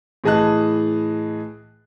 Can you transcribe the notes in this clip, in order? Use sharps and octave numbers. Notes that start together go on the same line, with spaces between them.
A2 E3 G#4 D#5 A5 F#6